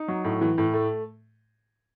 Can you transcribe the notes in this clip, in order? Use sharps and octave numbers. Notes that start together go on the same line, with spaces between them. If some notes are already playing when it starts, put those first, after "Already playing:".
Already playing: D#4
F#3
A2
E3
A2
A3